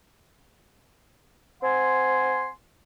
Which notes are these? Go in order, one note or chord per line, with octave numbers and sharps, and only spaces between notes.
C4 F#5 G#5 C6